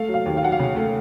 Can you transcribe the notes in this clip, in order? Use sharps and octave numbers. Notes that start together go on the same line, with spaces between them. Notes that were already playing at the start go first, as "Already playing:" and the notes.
Already playing: A3 F5
F#3
F5
D#2
F5
F#3 F#5
F5
C#3
A3